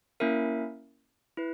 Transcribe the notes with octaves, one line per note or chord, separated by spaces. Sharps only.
A#3 C#4 E4 A#4 E5
E4 B4